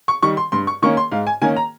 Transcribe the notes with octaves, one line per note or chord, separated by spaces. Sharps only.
C#6
D#3 G3 C#6
C6
G2 C6
C#6
D#3 A#3 C#4 C#6
C6
G#2 F5
G#5
D#3 A#3 C#4 G#5
A#5